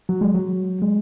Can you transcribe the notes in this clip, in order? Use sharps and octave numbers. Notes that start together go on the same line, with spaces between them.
F#3
G#3
F#3
G#3